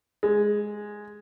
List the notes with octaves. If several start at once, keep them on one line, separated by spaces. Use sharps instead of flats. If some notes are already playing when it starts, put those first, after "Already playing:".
G#3